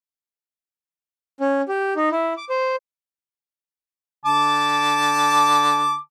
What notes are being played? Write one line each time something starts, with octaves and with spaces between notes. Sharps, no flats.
C#4
G4
D#4
E4
D6
C5
D3 A5 D6